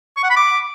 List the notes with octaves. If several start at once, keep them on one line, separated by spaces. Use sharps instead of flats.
C#6
F#5
B5
D6